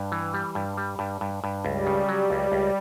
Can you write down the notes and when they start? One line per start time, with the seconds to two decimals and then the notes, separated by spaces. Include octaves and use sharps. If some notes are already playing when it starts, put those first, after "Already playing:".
Already playing: G2
0.12 E3
0.34 G3
0.55 G2
0.77 G3
0.99 G2
1.21 G2
1.44 G2
1.65 C#2 G3
1.87 C#3
2.09 F#3
2.30 C#2
2.52 C#2